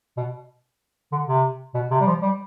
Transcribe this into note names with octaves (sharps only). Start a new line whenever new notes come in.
B2
D3
C3
B2
C3
G3
F3
G3